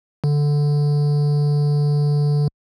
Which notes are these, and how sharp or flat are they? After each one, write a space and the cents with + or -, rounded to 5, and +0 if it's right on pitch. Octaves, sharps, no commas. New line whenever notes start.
D3 -5